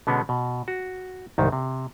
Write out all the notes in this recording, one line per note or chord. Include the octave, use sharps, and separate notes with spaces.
B2 D3 G#3 B3 C#4 D4
B2
F#4
C2 G#2 D#3
C3